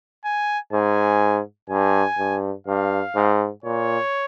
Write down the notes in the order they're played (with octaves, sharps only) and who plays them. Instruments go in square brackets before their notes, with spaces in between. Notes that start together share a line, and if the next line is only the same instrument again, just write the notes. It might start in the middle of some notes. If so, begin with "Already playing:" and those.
[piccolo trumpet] G#5
[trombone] G#2 [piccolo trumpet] G#5
[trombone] G2 [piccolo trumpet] G#5
[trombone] G2
[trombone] G2 [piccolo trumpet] F5
[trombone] G#2
[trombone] A#2 [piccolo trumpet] C#5